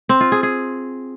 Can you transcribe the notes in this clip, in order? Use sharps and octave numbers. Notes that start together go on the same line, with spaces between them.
C4
F4
G#4
G#4